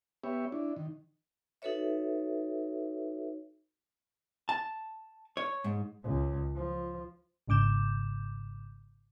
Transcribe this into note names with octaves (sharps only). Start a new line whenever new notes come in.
B3 G4 C#5 E5
D4 E4
D#3
D#4 F#4 A4 B4 C#5 E5
A5
C#5
G#2
C#2 C#3
F3
G#1 G#2 C#3 D6 G6 E7